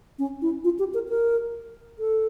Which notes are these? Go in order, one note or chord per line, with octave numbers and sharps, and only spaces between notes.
C#4
E4
F4
G4
A#4
A#4
A4